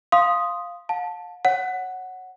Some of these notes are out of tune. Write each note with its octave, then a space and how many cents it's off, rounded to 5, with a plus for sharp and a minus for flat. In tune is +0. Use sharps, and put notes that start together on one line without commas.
F5 +0 C6 +0 D#6 +0
F5 +45 A5 +0
C#5 -10 F#5 +0